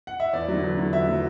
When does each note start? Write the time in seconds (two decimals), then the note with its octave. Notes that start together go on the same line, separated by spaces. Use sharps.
0.07 F#5
0.20 E5
0.33 E2 D5
0.48 D3 F#3
0.63 E2
0.78 D3 F#3
0.93 E2 E5
1.08 D3 F#3